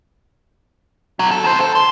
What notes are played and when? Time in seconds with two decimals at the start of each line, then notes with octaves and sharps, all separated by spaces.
1.19 B2 F#3
1.31 A4
1.44 D#3 C5
1.61 A4
1.75 C6